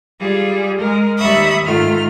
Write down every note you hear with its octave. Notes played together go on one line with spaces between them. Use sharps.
G3 F4 G#4
G#3 A#4
D#2 G3 E5 B5 C#6 D#6
G#2 D#3 A3 F4 F6